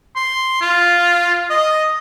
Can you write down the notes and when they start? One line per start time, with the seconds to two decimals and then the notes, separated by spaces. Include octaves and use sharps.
0.16 C6
0.61 F4
1.50 D#5